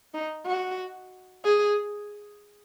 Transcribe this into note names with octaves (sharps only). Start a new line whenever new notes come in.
D#4
F#4
G#4